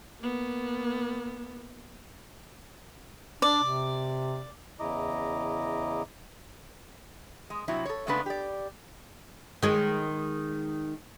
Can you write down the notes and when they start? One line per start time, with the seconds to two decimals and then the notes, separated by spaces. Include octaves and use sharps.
0.19 A#3 B3
3.42 D4 D5
3.63 C3
4.80 E2 C#3 E4 D#5 A#5 D6
7.50 G#3
7.68 C3 F#3 E4
7.85 A4 C#5
8.07 C#3 G#3 A3 B3 D4 B4
8.26 G4 D5
9.63 D#3 G#3